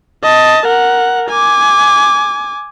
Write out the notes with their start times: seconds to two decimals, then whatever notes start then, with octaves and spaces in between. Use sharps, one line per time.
0.23 D#5 A5
0.66 A#4 F#5
1.29 G#5 D6